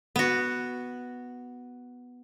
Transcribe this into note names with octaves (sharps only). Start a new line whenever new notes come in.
B3 F#4